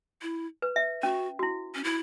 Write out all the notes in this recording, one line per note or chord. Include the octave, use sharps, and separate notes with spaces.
E4
B4
E5
C#4 F#4
F#4
E4
C#4
E4